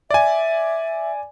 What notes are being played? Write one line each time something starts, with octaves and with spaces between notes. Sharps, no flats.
D5 E5 G#5